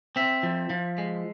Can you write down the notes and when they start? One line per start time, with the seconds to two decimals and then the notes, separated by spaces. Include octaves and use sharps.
0.16 C4 E5
0.43 F3
0.70 F3
0.98 G#3